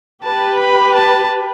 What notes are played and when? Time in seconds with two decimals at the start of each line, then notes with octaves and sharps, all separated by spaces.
0.23 G4 B4 A5
0.59 B5
0.95 A5